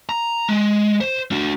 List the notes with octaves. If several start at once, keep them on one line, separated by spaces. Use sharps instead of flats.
A#5
G#3
C5
D4 F#4